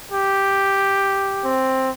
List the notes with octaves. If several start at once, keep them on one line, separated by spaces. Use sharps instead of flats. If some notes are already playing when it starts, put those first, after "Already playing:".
G4
C4